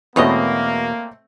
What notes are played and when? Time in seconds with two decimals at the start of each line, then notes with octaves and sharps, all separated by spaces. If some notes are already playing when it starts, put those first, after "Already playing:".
0.16 E2 B2 A3 A#3 C4 B4 C#5 D#5